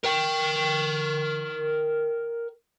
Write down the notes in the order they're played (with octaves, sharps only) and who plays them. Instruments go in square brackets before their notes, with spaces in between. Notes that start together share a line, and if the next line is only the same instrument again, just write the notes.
[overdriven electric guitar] A#4 G5